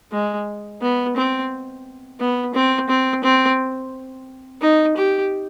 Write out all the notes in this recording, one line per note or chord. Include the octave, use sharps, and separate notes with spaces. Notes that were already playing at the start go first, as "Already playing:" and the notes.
G#3
B3
C4
B3
C4
C4
C4
D#4
G4